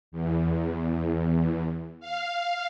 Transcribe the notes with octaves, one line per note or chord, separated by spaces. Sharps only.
E2
F5